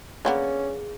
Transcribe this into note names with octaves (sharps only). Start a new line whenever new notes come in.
D3 A#3 B3 C#4 G#4